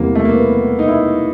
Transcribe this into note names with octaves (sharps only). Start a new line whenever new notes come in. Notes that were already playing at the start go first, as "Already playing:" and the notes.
Already playing: E2 C3 E3 G3 A#3
A3
A#3
B3
D#4
E4